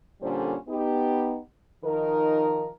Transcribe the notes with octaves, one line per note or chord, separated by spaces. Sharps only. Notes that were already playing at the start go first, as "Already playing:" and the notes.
A#2 D3 G3 C#4 A4 C5
B3 D#4 G4
D#3 F3 D#4 A#4